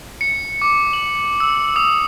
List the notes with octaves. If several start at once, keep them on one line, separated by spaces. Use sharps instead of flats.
C#7
D6
F#7
E6
D#6